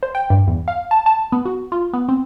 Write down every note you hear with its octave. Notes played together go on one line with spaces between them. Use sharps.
C5
G5
G2
E2
F5
A5
A5
B3
F#4
F4
B3
C4